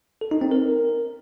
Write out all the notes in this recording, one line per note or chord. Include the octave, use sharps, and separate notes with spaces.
A4
D#4
C4
A#4